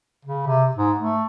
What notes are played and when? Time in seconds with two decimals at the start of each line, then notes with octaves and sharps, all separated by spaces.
0.25 C#3
0.47 C3
0.77 G#2
0.98 A3